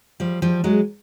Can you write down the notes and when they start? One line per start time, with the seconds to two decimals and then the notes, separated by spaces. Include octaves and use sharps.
0.20 F3 G3
0.42 F3 G3
0.64 F#3 G#3